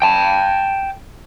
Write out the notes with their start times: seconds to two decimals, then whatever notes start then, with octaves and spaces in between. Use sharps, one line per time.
0.02 G5 A5